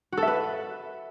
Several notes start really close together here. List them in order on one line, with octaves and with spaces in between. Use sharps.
F#4 A4 E5 B4